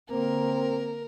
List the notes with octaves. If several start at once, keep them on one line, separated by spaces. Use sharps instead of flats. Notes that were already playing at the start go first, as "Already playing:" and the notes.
D3 A#3 C4 A#4